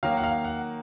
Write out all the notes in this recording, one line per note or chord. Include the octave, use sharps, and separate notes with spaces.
D#3 F#3 A#3 F5
F#5
F5
F#5